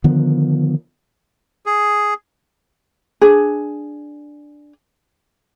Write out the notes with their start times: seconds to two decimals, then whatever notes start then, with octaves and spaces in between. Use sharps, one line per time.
0.04 D3 D#3 F3 B3
1.66 G#4
3.21 D4 G#4